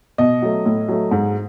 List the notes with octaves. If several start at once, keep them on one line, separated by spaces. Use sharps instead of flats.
B2 D#5
F#3 A3
A2
F#3 A3
G#2